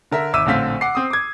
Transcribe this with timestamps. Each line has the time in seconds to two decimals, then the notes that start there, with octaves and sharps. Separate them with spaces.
0.12 D3 A#4 E5
0.33 G#1 E5 D6 E6 D#7
0.46 A#1 A2 D3 C4 F5 B6
0.81 F#5 D6 C7
0.95 C4 D#6
1.10 D6 G#6